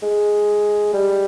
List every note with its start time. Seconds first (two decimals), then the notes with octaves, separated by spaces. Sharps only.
0.03 G#3
0.94 G3